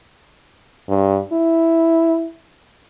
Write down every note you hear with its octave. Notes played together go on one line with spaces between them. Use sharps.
G2
E4